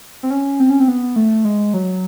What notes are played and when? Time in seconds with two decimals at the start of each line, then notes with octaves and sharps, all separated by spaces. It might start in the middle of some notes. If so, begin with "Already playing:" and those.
0.23 C4
0.30 C#4
0.60 C4
0.70 C#4
0.80 C4
0.88 B3
1.16 A3
1.45 G#3
1.74 F#3